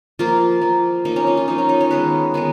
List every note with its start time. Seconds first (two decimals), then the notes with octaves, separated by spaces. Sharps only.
0.19 F3 A#3 F4
0.62 F3 A#3
1.05 F3 A#3 D#4
1.16 C#4
1.27 D#4
1.37 F4
1.48 F3 A#3 D#4
1.58 C#4
1.69 D#4
1.81 C#5
1.90 D#3 G#3 B3 B4
2.34 D#3 G#3 B3